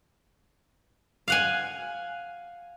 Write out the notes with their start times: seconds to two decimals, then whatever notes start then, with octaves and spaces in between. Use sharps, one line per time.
1.28 F5 F#5 G#5